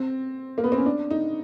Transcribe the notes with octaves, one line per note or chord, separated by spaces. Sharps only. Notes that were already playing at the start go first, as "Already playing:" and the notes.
Already playing: C4
A#3
B3
C4
C#4
D4
D#4